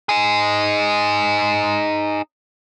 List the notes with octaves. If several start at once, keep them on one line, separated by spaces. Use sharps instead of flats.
D#4 G#4